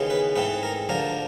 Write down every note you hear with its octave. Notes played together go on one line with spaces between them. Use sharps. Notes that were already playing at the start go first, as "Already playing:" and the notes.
Already playing: D#2 C#3 E3 G#3 B3
B4
G#2 E3 A3 C4 B4
A#4
D2 D3 F3 A#4